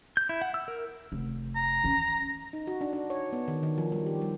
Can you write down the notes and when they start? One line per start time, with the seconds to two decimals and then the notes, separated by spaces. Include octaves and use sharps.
0.17 G6
0.29 E4
0.42 F#5
0.54 E6
0.68 A#4
1.12 F1
1.56 A#5
1.84 E3 C#4
2.53 D#4
2.67 F#4
2.81 D4
2.93 D4
3.10 C#5
3.33 B3
3.48 D#3
3.63 D#3
3.78 F3
3.92 G3
4.07 G4
4.22 G3